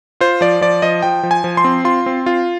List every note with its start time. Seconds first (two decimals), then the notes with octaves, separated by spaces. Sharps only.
0.20 F4 C5
0.41 F3 D5
0.61 F3 D5
0.82 F3 D#5
1.02 F3 G5
1.23 F3
1.31 G#5
1.44 F3
1.57 C6
1.64 C4
1.85 F4 C6
2.06 C4
2.26 F4